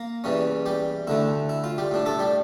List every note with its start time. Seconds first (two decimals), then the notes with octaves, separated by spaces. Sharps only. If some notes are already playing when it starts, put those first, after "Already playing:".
Already playing: A#3 A#4
0.24 E2 E3 G3 C#4
0.66 G3 G4
1.07 D2 D3 A3 E4
1.49 E4
1.64 F4
1.78 G3 G4
1.91 A2 G3 D4
2.06 A3 A4
2.19 G3 G4